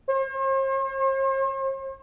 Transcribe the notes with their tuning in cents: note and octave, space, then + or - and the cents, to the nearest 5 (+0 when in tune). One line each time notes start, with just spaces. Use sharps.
C5 +45